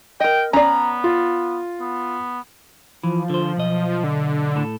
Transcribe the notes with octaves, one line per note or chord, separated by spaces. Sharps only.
A#4 D#5 G5
B3 C#4 D5 A#5
F4
B3
E3 F3
D3 C5
B1 D#5
D3
A2 A4